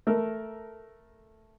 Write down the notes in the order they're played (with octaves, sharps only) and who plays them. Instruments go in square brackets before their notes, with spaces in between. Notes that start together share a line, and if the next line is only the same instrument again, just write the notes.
[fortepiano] A3 A4 A#4